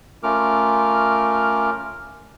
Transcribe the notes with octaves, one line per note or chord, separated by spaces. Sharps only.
A3 C#4 F4 A#4 D6 F6